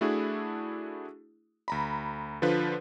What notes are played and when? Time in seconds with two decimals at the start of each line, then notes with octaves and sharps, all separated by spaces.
0.01 A3 D4 E4 F#4 G#4
1.68 D2 A#5 B5
2.42 D3 F3 D4 F4 B4